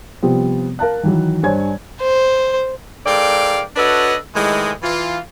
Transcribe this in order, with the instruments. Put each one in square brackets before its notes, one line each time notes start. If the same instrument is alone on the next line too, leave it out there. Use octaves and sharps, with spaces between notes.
[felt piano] C3 F3 G3 B3 C4
A#4 F5 A5 F#6
D#3 E3 F#3
G2 C5 C#5 G#5 G#6
[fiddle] C5
[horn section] G#2 A4 A#4 D5 F5 G5
D4 F#4 A4 B4 C#5 D#5
A2 D#3 E3 G#3
E3 F4